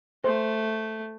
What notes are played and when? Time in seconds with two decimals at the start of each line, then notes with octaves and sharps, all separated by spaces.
0.24 A3 C5